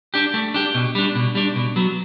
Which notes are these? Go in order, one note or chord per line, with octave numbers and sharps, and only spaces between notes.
D4 G4
A3
D4 G4
B2
G3 D4
B2
G3 D4
B2
F#3 B3